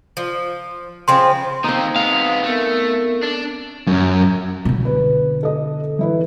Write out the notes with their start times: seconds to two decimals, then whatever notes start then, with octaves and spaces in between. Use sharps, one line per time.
0.17 F3
1.08 C#3 F3 C4 C6
1.64 D#3 A#3 C4 D#4
1.96 G#3 B3 F5
2.44 A3 B3 A#4
3.23 D4 A5
3.87 F#2
4.65 B2 D3
4.85 B4
5.43 A4 D#5
5.99 E3 E4 B4